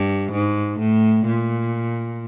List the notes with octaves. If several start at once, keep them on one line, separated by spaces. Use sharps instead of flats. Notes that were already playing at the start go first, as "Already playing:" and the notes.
Already playing: G2
G#2
A2
A#2